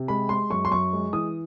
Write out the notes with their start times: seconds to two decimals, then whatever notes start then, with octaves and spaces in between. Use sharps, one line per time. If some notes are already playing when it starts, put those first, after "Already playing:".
Already playing: C3
0.08 G#3 B5
0.29 G#3 C6
0.50 F#2 C#6
0.65 C6
0.71 F#2 C#6
0.93 G#3
1.13 E3 D#6